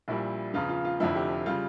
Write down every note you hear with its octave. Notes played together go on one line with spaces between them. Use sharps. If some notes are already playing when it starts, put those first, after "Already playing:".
A#1 A#2 G3 E4
E2 C#3 F3 F4
F4
F4
F1 F2 D3 F3 E4
G4
C#3 G3 F4